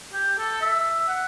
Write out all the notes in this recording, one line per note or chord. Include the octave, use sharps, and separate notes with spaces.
G4
A4
E5
F#5